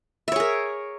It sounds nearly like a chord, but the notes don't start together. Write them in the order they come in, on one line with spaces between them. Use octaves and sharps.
E5 C#5 G#4 A#4